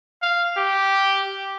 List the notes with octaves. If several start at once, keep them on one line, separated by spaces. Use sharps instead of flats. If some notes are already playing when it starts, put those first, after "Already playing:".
F5
G4